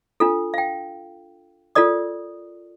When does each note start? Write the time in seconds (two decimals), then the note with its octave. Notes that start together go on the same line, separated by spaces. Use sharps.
0.20 D4 F4 A4
0.54 F5 G5
1.75 F4 A4 A#4 D5 D#6